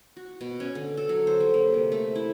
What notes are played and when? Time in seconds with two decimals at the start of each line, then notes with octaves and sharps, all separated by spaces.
0.16 F#4
0.41 B2
0.60 C#4
0.75 D3
0.97 A4
1.09 F#3
1.27 C5
1.40 G3
1.54 A#3
1.74 C3
1.92 A3
2.15 E4